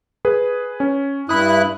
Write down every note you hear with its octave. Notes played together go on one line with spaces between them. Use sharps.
G#4 B4
C#4
G2 E4 B5 D#6 F#6